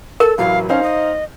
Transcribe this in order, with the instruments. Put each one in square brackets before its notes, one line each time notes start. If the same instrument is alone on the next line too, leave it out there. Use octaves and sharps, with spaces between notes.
[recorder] A4 [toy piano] A#4
[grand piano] A1 F#3 E4 [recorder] F5
[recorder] C#4 [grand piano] D#4 C5 F5
[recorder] D#5